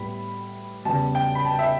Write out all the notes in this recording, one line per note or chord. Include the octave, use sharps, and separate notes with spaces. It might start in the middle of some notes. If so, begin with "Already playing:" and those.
Already playing: A2 G3 B3 B5
E2 C#3 G3 A5
G5
B5
A5
E5